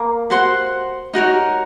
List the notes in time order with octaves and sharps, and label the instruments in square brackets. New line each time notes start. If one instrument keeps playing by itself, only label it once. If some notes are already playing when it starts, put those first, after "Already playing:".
Already playing: [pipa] A#3
[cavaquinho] F#4 C5 F#5 C6
D#4 F#4 A#4 C#5